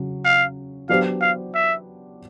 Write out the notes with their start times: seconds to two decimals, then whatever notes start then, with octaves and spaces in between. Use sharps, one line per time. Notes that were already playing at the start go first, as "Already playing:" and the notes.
Already playing: C#3 F#3 C#4
0.25 F5
0.89 F#3 B3 D4 G4 C5 F5
1.22 F5
1.55 E5